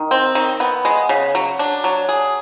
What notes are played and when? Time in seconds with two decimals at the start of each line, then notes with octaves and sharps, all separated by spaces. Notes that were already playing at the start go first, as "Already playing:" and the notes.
Already playing: D#3
0.11 C4
0.35 D#3
0.60 B3
0.85 G#3
1.09 C#3
1.35 F#3
1.59 D4
1.84 F#3
2.09 G#4